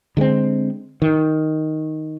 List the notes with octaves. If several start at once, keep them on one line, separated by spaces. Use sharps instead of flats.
D3 G#3 B3 C4
D#3